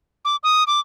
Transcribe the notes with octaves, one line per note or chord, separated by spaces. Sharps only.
D6
D#6
D6